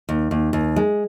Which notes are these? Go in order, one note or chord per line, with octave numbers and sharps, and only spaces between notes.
D#2
D#2
D#2
G#3